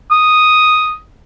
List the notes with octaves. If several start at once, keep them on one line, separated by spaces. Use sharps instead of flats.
D#6